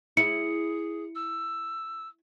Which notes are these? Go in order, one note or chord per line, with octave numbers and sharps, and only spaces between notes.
E4 G#4 C#7
E6